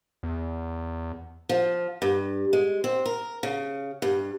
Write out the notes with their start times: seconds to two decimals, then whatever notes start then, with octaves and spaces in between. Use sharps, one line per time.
0.23 E2
1.49 F3
2.02 G2
2.53 G#3
2.84 C4
3.06 A#4
3.43 C#3
4.02 G2